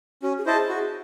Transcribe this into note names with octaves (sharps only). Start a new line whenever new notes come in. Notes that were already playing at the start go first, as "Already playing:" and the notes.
C#4 F#4
G#4
E4 C5 D#5 A5
G#4
F#4